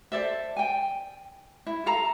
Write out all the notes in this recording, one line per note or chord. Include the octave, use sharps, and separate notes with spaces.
A4 C5 D5 E5
G5 G#5
E4
A4 F5 A#5